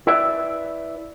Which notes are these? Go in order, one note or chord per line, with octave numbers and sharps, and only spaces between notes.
E4 B4 D5 E5